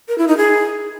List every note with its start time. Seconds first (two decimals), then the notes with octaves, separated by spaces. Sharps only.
0.08 A#4
0.18 E4
0.28 D#4
0.37 G#4